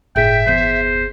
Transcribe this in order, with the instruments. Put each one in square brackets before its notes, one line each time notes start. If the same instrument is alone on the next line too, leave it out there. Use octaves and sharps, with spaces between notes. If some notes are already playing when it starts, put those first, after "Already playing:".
[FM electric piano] G1 G#4 B6 [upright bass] A2 [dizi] E5 [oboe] G5
[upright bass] E2 B3 [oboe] C5